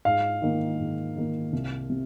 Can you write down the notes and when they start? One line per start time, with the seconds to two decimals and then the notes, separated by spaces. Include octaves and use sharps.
0.05 G#2 F5
0.42 D#3 A#3
0.79 G#2
1.16 D#3 A#3
1.53 C2
1.90 C3